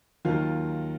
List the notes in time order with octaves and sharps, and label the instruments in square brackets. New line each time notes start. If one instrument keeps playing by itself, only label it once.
[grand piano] D#2 D#3 F#3 F4